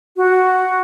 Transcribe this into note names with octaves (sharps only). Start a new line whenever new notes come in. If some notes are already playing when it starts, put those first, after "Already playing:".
F#4